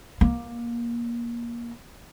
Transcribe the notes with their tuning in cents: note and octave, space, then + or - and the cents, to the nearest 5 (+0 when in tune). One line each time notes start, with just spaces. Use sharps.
A#3 +20